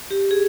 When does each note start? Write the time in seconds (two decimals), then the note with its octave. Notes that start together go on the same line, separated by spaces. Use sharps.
0.11 G4
0.31 G#4